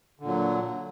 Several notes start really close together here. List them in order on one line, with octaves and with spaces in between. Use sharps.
D3 A#2 F#3